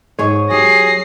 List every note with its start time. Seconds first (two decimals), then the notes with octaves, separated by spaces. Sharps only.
0.19 G#2 G#4 C#5 D#5
0.50 F#3 G4 G#4 A#6 C7